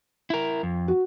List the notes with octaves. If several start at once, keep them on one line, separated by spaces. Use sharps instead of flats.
E4 A#4
F2
F#4